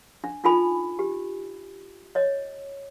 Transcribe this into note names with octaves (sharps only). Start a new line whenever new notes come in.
D4
D4 D#4 F4 A4 G#5 B5
G4
C#5 D#5